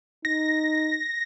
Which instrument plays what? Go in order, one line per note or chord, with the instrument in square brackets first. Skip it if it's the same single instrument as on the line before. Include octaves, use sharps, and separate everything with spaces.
[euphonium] D#4 [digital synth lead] A#6